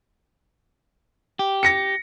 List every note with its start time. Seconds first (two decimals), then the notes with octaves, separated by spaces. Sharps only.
1.39 G4
1.63 A#6 C#7